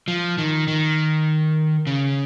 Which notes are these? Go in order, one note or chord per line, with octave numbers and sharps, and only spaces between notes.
F3
D#3
D#3
C#3